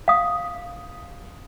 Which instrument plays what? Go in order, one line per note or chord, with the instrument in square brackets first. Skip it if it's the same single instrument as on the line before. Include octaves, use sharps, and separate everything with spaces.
[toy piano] F5 D#6